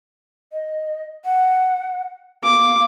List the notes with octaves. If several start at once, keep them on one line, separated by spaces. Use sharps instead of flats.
D#5
F#5
F5 D6